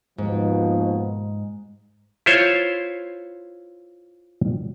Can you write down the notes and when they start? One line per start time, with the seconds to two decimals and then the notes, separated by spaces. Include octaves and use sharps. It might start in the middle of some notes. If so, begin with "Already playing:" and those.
0.18 D#2 G#2 B2 F3
2.26 E4 F4 C5 C#5